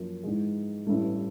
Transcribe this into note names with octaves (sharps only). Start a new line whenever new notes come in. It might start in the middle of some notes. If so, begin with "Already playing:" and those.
Already playing: F#2 F3 A#3
G#2 E3 G#3
A1 G2 E3 A3